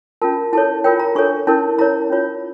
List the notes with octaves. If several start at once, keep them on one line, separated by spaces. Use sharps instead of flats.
C#4 F4 A#4 A5
E4 A4 C#5 A5
F4 A#4 C#5 G5
A#5
D4 A4 C#5 C#6
C#4 E4 A#4 A5
E4 A#4 C#5 A#5
C#4 F4 C#5